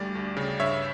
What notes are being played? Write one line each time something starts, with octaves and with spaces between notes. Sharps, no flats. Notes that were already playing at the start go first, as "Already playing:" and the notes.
Already playing: D2 G3 A3 D5
D2
C#3
G2 C#5 E5